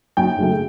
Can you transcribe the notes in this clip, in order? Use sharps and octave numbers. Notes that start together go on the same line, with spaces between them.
F#2 G5
C#3 F#3 A3